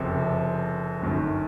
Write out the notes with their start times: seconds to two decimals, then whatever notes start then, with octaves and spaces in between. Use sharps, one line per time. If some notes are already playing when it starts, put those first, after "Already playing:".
Already playing: F#1 F2 C3
1.02 G1 F#2 D#3